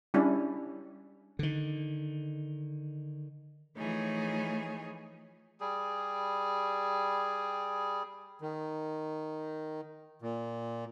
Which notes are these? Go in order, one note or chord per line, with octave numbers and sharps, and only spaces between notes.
G3 C#4 D4 E4
D3 D#3
E3 F3 A3 D#4 G#4 C#5
G3 G#4
D#3
A#2